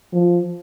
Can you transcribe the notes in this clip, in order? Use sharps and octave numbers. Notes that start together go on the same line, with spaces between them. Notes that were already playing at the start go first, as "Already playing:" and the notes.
F3